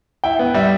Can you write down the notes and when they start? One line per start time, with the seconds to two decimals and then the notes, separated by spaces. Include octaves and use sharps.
0.24 E4 G5
0.39 B3
0.54 G3 E5